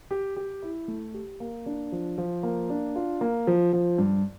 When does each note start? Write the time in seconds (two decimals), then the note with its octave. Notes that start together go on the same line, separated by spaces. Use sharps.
0.11 G4
0.37 G4
0.62 E4
0.88 A3
1.14 G4
1.40 A#3
1.66 D4
1.92 F3
2.18 F3
2.43 A#3
2.70 D4
2.96 F4
3.21 A#3
3.47 F3
3.73 F3
3.98 G2